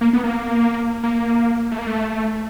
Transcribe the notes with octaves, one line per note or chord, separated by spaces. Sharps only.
A#3
B3
A#3
A#3
A3
A#3
A3